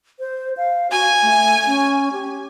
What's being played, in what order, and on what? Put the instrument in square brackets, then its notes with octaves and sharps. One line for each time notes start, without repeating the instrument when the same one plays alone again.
[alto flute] C5
F5
[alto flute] F#4 [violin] G#5
[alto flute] A3
C#4
G4